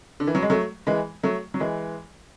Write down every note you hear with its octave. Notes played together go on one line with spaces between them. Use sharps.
D3
E3
F#3
G#3
F#3 A3
E3 G#3
F#3 A3
F#3
E3 G#3